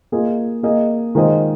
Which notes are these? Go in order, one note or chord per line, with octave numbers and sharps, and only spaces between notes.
A#3 F4 G#4 D#5
A#3 G#4 D#5
D#3 G#3 F4 C5 D#5